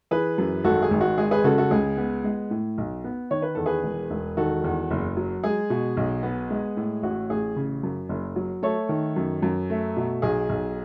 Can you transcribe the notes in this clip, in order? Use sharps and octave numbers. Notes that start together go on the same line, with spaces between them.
E3 G#4 B4
F#2
G#1 F#4 A4
G#4
G#1
F#4
G#3 G#4
G#4 B4
C#3 F#4 A4
F#4 A4
C#2 G#4
B3
G#3
A2
B1
B3
D#3 C#5
B4
E2 A4
G#4 B4
E1
E1
D#3 F#4 A4
E2
F#1
F#3
G#3 G#4
B2
B1
B3
G#3
A2
A1 F#4
A1 G#4
C#3
F#2
F#1
F#3
A3 A4 C#5
D#3
F#2
F#2
A3
B2
B1 G#4
B1